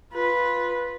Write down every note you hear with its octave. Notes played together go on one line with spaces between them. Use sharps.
F4 B4